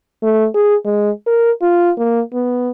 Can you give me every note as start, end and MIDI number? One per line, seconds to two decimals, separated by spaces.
0.23 0.47 57
0.54 0.75 68
0.85 1.10 56
1.27 1.51 70
1.62 1.91 65
1.98 2.21 58
2.33 2.71 59